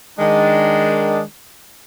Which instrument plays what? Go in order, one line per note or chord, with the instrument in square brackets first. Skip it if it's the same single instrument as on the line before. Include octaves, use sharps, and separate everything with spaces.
[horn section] D#3 G#3 D4